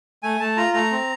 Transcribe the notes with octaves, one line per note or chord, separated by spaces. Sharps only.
A3 G#5
A3 A5
F4 A#5
A3 A#5
C4